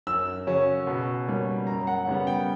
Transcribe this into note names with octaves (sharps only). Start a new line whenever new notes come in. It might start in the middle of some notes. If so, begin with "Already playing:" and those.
F#2 E6
C#3 F#3 C#4
B2
G3 A#3 C#4
F#2 A#5
F#5
C#3 G3 B3
G5